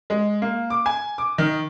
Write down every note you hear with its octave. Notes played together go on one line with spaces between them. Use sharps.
G#3
A#3
D6
G#5
D6
D#3